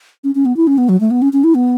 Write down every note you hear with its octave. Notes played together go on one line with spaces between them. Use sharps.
C#4
C#4
B3
E4
C#4
B3
F#3
A3
B3
C#4
C#4
E4
B3